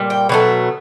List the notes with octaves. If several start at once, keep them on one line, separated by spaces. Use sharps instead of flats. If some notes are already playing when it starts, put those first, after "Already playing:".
Already playing: A#2 G3
G5
B2 F#3 A3